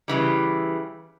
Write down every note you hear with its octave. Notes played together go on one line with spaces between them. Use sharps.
C#3 E3 G3